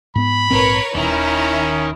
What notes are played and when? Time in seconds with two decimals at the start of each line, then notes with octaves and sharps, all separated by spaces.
0.16 G#2 B3 B5
0.51 A#1 G#2 C4 A#4 B4 C#5
0.95 D#1 D#3 C#4 E4 A#5